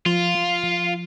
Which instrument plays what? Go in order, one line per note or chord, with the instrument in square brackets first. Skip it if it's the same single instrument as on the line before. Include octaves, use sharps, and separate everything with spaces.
[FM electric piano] F3 [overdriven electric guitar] F4
[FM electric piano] F3
F3